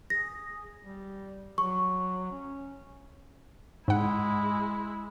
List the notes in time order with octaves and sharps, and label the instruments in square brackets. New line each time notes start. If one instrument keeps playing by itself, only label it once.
[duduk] G#4 [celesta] A#6
[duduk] G3
[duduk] F#3 [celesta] C#6
[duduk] C#4
[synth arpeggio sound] G#2 F#5 [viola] G#3 E4